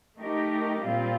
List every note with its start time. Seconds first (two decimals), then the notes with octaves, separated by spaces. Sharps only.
0.17 A3 D#4 G4 A#4
0.83 A#2 G3 C4 F4